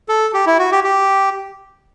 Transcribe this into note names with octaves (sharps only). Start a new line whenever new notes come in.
A4
G4
E4
F#4
G4
G4